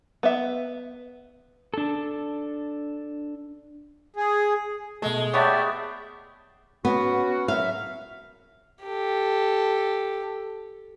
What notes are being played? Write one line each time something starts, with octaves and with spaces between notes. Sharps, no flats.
B3 E5
D4 A4
G#4
B2 G#3 A3
A3 B3 G4 C#5 D5 E5
B3 C#4 F#4
F#2 F#3 E5 F5
G4 A4